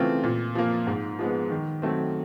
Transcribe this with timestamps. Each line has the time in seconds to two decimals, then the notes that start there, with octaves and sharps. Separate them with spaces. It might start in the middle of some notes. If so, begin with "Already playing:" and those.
Already playing: C#3 E3 A3 C4 F4
0.23 A#2
0.55 F3 A#3
0.87 G#2
1.19 F3 G#3 B3
1.50 D#3
1.82 F#3 A3 C4